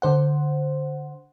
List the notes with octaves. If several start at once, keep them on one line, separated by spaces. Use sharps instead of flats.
D3 C5 F#5